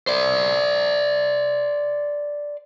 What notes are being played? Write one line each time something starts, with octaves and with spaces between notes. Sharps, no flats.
C5 D5